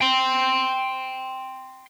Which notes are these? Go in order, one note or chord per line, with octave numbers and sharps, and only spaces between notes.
G5 C6